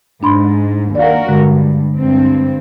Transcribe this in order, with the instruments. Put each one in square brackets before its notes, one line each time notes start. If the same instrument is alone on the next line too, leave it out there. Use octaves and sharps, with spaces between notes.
[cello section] G#2 [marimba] D4 B5 C6
[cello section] D#2 F#4 A#4 [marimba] D5 F5
[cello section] G2 [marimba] D3 G#3
[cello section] G2 C4